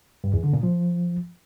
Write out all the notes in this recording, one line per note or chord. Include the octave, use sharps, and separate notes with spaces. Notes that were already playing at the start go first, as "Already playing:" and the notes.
G2
E2
D3
A#2
F3